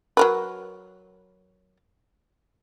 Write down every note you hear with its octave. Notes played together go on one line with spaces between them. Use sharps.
F#3 A#4 B4